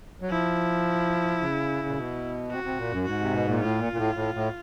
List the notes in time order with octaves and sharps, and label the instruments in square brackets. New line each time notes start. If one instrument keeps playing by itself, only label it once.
[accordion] F#3
[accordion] F3 [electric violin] E4
[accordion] C#3
A#2
B2
[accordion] C3 [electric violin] F#4
[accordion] C3
A#2
F#2
[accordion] G#2 [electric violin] F#4
[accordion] C3
B2
A#2
[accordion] A2 [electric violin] F4
[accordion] A#2
A#2
A2
A2
A2